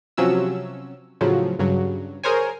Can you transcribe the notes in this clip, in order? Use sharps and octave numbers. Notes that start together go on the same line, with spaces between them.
C3 F3 F#3 C#4 E6
A2 C#3 F3 F#3
G2 C#3 F#3
G#4 A#4 C5 C#5 G#5